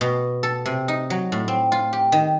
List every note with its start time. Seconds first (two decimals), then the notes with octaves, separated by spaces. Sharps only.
0.01 B2
0.43 A4
0.66 C3
0.88 D#4
1.10 F#3
1.32 A2
1.48 C4
1.72 F4
1.93 G4
2.12 D#3